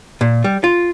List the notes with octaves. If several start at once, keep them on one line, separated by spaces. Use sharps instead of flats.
A#2
G3
F4